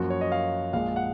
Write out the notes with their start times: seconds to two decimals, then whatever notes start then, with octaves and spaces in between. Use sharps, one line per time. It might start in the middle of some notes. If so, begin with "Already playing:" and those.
Already playing: F#2 F3 A#3 F#4
0.10 C#5
0.21 D#5
0.32 F5
0.73 A#1 A#2 G#3 F5
0.96 F#5